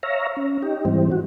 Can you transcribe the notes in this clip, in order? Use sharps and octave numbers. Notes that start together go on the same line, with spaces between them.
C#5 E5 F5 A#5
C#4
D#4 G4
G#2 E3 G3 C4
F#4